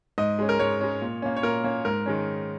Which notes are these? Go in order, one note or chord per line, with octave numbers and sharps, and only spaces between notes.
G#2 D#5
G#3 C#4
A#4
G#2 C#5
G#3 C#4
A#2
A#3 C#4
C#5
A#2 A#4
A#3 C#4
G#2 A#4
D#3 G#3 C#4